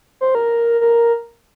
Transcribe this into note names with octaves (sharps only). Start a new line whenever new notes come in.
C5
A#4
A#4